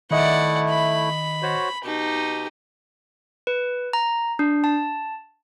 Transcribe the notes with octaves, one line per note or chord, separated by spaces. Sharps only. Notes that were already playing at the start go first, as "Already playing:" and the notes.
D#3 A3 E4 D5 D#5 F#5
B5
F#4 C5 C#5
B2 D#4 G4
B4
A#5
D4
A5